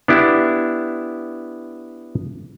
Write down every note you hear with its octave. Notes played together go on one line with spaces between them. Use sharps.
B3 D4 E4 G4